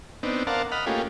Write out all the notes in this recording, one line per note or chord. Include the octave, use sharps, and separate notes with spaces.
B3 C4 D4 D#4
A#4 C5 D5 F5 F#5 A5
D#5 F#5 B5 F6
A3 A#3 C#4 F4 G4 G#4